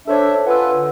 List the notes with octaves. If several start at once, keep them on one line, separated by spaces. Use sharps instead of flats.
D4 A4 C5 C#5 E5
F4 B4 F#5 G#5 E6
D3